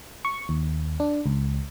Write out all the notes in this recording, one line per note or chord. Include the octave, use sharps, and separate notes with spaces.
C#6
D#2
D4
C#2